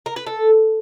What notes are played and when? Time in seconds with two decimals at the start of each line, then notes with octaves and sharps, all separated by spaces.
0.06 A#4
0.16 B4
0.27 A4